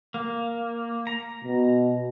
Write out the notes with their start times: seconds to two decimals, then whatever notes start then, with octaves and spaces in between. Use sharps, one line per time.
0.14 A#3
1.07 A#5
1.44 B2